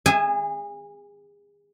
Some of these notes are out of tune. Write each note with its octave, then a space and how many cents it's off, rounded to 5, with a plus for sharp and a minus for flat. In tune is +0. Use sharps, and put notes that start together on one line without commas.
G#4 -30 E5 +0 G#5 +0